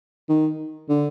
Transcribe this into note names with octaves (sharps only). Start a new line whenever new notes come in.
D#3
D3